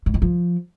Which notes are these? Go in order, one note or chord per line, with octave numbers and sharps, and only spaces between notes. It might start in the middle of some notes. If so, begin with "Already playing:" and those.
G#2
D#3
F3